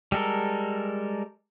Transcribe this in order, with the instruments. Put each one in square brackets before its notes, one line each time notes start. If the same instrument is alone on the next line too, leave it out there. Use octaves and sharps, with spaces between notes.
[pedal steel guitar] G3 G#3 A4 A#4